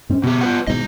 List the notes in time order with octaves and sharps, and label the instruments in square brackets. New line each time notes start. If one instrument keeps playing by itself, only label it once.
[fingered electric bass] G#2 C4 C#4
[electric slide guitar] B2 G4 [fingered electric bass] B3
[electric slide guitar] F4 B4 F#5
[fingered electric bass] G#1 G#2 B2 [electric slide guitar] E4 D#5